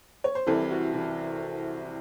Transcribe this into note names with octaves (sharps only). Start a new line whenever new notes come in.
C#5
C5
C2 C3 E3 A4
F#4
E3